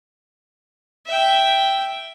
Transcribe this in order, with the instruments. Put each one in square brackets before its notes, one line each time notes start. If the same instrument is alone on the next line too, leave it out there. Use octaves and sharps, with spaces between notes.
[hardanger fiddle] E5 G5